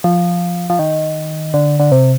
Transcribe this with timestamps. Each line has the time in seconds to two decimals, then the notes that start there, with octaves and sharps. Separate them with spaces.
0.04 F3
0.70 F3
0.79 D#3
1.54 D3
1.80 D3
1.92 C3